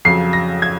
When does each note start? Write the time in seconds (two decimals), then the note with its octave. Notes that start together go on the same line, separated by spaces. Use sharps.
0.05 F2 C#3 F#3 C7
0.33 A#6
0.62 G#6